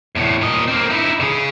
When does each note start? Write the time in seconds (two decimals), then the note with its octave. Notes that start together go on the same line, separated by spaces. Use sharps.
0.15 E2 A2
0.41 A#2 D#5
0.68 A#3 C4
0.90 D#4 E4
1.20 C#3 G#4